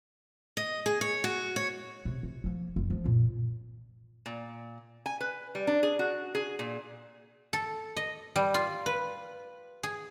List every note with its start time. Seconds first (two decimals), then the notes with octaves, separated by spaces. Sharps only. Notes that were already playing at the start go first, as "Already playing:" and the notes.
0.57 D#5
0.86 G#4
1.01 C#5
1.24 F#4
1.56 C#5
2.05 C3
2.23 C3
2.44 F3 A#3
2.76 F#1
2.90 F3 A3
3.04 F#2 A#2
4.26 A#2
5.06 G#5
5.21 B4
5.55 G3
5.67 D4
5.83 G#4
5.99 F#4
6.35 G#4
6.59 A#2
7.53 A4
7.97 D#5
8.36 G3
8.54 F4
8.86 B4
9.83 G#4